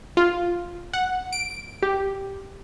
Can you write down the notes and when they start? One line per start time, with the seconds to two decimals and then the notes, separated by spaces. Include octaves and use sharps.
0.17 F4
0.94 F#5
1.33 D7
1.82 G4